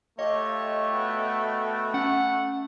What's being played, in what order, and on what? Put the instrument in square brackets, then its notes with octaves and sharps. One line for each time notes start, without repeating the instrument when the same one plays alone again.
[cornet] A3 [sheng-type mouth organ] F4 G4 [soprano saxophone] C#5 [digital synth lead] D#5
[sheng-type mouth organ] B3 F#4 G5
[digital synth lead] C#4 [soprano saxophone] F#5